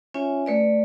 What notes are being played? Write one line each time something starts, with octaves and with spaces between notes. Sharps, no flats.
C#4 F4 C#5 E5 G#5
A3 B4 D5